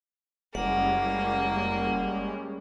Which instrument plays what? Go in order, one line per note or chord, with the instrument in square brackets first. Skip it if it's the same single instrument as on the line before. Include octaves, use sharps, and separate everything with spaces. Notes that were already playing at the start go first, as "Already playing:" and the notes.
[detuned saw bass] F#1 [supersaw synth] G3 G#3 C#4 [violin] A#3 [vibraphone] F#5